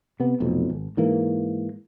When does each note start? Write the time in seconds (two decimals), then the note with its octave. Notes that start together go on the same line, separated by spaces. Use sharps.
0.20 C3 B3
0.40 F1 B1 F2
0.70 G#1
0.97 G#2 E3 A#3